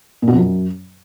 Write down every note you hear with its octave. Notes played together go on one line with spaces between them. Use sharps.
A#2
B2
F2
F#2